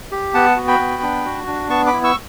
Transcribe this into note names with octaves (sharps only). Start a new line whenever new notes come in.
G4
B3 F#5 A5
F#4
G5 B5
B3
D4
F#4
D4
B3 A5 C#6
B5 D6
E4
C#6 E6